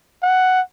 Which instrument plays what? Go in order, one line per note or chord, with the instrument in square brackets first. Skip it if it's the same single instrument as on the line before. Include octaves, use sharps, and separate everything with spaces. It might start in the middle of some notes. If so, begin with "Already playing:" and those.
[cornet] F#5